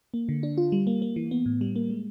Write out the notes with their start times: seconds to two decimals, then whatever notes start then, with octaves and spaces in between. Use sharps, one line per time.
0.14 A#3
0.29 D3
0.43 D4
0.57 F4
0.72 G3
0.87 A#3
1.02 A#3
1.16 E3
1.31 B3
1.46 A2
1.61 G3
1.76 A#3
1.90 G#3